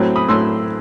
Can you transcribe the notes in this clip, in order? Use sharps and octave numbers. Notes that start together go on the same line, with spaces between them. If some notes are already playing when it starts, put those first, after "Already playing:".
Already playing: A2 F#3 C4
B5 D#6
A2 F#3 C6 E6